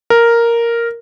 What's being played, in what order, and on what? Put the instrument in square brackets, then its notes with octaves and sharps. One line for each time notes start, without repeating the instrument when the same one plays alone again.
[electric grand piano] A#4